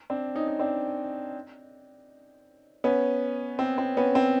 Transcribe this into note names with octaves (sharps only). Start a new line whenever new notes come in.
C4 D4
C#4 D#4
D#4
C4 D4
B3 C#4
C4
C4
B3 C#4
C4